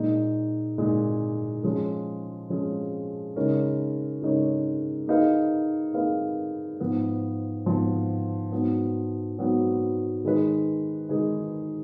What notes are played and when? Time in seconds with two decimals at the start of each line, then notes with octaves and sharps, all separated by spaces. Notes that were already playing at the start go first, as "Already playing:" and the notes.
Already playing: A#2 G#3 D#4
0.78 A#2 G#3 D#4
1.64 F3 G#3 C#4 G#4
2.50 F3 G#3 C#4 G#4
3.36 C#3 G#3 D#4 A#4 C#5
4.22 C#3 G#3 D#4 A#4 C#5
5.07 A#3 D#4 G#4 B4 F5
5.94 A#3 D#4 G#4 B4 F5
6.80 G#2 F3 B3
7.66 G#2 F3 B3
8.52 G#2 F#3 B3
9.38 G#2 F#3 B3
10.24 D#3 G#3 D#4 G#4 B4
11.09 D#3 G#3 D#4 G#4 B4